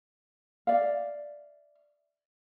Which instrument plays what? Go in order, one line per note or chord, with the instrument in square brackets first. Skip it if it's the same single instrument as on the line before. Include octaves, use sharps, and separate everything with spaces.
[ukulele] D5 E5 F5